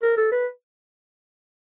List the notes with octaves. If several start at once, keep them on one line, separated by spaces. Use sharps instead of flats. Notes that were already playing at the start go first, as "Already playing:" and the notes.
A#4
A4
B4